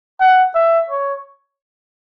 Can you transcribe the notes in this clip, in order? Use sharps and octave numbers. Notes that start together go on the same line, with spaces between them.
F#5
E5
C#5